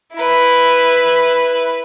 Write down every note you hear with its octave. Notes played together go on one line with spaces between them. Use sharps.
E4 B4